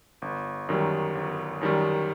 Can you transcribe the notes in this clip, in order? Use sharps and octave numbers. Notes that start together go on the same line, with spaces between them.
G1
F#2 D#3 G3
G1
F#2 D#3 G3